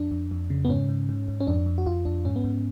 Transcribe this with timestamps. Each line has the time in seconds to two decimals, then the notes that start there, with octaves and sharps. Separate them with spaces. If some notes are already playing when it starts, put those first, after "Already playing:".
Already playing: F2 D4
0.11 F2
0.31 F2
0.50 C#3
0.65 B3
0.69 G#2 C#4
0.89 G#2
1.09 G#2
1.28 G#2
1.40 C#4
1.47 F2 D4
1.66 F2
1.78 F#4
1.86 F2 F4
2.05 F2 D4
2.25 G#2 C#4
2.36 B3
2.44 G#2